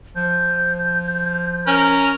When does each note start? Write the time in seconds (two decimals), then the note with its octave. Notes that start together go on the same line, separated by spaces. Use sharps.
0.16 F3 G6
1.67 C#4 A#4